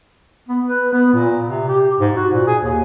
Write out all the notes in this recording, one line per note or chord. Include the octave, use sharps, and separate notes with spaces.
B3
B4
B3
A#2
C3
G4
G#2
F#4
A#2
G#4
D#2